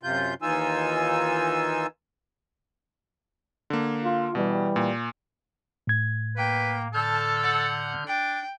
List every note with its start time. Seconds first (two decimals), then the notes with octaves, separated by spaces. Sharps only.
0.03 F#2 C3 F4 G6
0.42 D#2 E3 D#4 F4 G#5 E6
3.70 D3 A#3
4.04 F4
4.35 B2 E3 G3
4.76 A#2
5.87 A2 G#6
6.37 A#3 B4 G5
6.94 D3 A4 A5 F6 G6
7.43 F#5
8.07 D4 G5